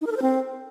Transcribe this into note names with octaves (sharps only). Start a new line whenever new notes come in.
D#4
A#4
A4
C5
C4